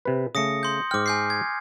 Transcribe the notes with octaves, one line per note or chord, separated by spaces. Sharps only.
C3 B4
C#3 A3 D#6 A#6 C#7
C6 G6
G#2 G5 D6 F6
G#5 G6 C7
G#6